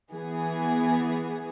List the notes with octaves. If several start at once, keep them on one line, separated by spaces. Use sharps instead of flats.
E3 B3 G#4